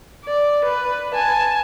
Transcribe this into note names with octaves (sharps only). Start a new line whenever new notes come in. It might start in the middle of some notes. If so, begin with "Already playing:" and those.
D5
B4
G#5 A5